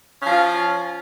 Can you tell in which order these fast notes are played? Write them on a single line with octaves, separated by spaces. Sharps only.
C#4 F3 F4